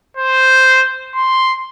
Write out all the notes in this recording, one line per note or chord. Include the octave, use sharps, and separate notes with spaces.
C5
C6